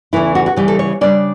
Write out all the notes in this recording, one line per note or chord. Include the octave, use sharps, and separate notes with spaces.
E2 C#3 E3 A3 E4
F#4
F#4
C#3 E3 G3 G4
A4
C#5
C#3 G3 D4 D5